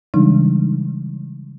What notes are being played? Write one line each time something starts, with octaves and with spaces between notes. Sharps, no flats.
C#3 E3 G3 G#3 D4 D#4